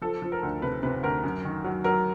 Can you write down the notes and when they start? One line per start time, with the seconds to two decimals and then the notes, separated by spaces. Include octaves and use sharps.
0.02 F3 A4
0.22 F3
0.32 A#4
0.43 D2
0.62 C3 B4
0.83 C3 B4
1.03 D2 A#4
1.23 F#2
1.45 D#3
1.64 F#3
1.84 F#3 A#4